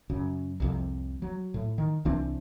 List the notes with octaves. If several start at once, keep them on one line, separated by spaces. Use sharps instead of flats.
F#2 C#3
C2 F2 C3
F#3
A2
D#3
C2 E3 C4 D4